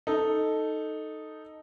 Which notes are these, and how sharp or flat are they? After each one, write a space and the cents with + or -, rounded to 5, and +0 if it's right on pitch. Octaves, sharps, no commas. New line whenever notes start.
D#4 +0 A4 +0